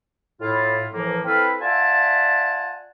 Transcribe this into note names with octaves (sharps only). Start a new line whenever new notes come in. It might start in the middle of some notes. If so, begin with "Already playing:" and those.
A2 E4 F4
A2 E3 F3 A#3
C4 E4 A4 B4 F5
F4 D5 E5 F#5 G#5 A5